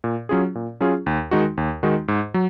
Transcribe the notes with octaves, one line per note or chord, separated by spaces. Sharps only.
A#2
F#3 C#4 F4 G#4
A#2
F#3 C#4 F4 G#4
D#2
D#3 G#3 D#4 F#4
D#2
D#3 G#3 D#4 F#4
G#2
F#3